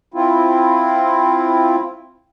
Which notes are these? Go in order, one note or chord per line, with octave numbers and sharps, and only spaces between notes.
C4 E4 F4